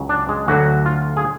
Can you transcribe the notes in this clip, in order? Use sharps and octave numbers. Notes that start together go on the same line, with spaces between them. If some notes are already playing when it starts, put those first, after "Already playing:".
Already playing: C#2 C#3 F#3
D4
G#3
D2 D3 F#3 F#4
F4
G#4